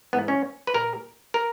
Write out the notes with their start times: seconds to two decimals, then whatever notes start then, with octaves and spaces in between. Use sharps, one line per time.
0.13 G#2 E3 B3
0.28 C#4
0.67 B4
0.74 A#2 A#4
1.34 A#4